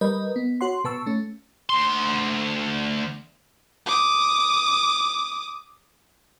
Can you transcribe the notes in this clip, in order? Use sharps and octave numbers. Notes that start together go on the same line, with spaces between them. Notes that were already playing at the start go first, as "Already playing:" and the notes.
G3 A#4 B4 D#5
B3
F#4 C#5 F#5 C6
B2 B4 A5 C#6 E6
A3 C#4
D2 C6
D6 D#6